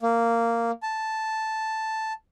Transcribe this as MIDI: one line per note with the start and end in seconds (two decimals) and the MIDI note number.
0.02 0.71 58
0.83 2.13 81